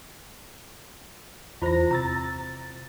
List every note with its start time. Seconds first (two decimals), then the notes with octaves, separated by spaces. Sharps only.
1.62 E2 E4 F4 C5 A#6
1.91 C3 A#5 E6 A6